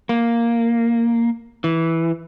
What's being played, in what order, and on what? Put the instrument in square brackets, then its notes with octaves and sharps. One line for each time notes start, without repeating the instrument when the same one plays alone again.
[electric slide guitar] A#3
E3